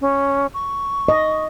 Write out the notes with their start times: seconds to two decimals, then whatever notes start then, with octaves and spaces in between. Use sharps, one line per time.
0.01 C#4
0.54 C#6
1.08 D#5